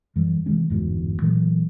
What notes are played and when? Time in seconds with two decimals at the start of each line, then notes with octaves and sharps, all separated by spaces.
0.16 F#2 E3 G3
0.46 C3 E3 G#3 C#4
0.70 G1 E2 G#2 B2
1.22 A#2 E3 F#3 A3